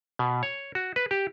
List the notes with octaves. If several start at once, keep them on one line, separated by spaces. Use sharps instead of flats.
B2
C#5
F#4
B4
G4